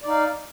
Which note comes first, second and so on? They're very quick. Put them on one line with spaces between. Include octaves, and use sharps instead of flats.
D5 D#4 F5